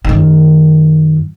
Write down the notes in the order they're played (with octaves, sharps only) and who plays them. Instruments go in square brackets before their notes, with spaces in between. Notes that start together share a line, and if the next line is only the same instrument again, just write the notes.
[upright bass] F#2 D#3